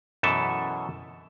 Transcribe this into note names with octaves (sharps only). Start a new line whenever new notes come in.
F#2 B2 E3 A4 E5 A5